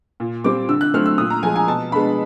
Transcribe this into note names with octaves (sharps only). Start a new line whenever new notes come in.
A#2
G3 C4 D6
D3 E6
F#6
F#3 A3 C4 F6
E6
A#2 D#6
A#5
F3 G#3 G#5
G#5
B2 A5
G#3 B3 D4 B5